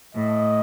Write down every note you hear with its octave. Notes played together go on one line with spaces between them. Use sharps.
A2 D#5